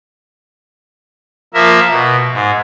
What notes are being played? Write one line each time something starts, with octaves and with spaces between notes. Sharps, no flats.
F3 A#3 A#4 E5
B2
G#2